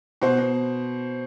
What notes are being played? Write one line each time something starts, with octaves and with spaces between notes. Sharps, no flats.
B2 C5
B2